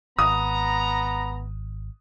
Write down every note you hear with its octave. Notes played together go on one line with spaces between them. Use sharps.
G#1 B3 A#5 D#6